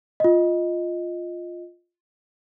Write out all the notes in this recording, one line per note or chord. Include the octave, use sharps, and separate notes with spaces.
F4 D#5